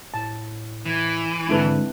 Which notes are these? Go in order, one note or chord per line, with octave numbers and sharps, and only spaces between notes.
A2 A5
E3
G#2 D3 C4 E4 A4 B4